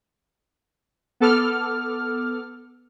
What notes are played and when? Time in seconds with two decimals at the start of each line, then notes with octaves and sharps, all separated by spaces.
1.20 B3 A4 D6 F6